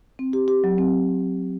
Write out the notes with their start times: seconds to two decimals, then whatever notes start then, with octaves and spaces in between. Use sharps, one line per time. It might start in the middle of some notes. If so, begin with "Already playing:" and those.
0.19 C4
0.33 G4
0.48 G4
0.64 F#3
0.78 C4